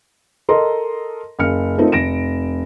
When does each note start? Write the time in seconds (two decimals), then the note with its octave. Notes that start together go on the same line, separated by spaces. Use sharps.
0.49 A4 A#4 D#5 A#5 C6
1.39 F#1 C#3 F6 C#7
1.78 A3 C4 D#4 F4 A4 A#4
1.92 F1 A#6 D7 E7